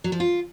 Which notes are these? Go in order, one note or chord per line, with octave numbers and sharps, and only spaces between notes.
F#3
F3
F4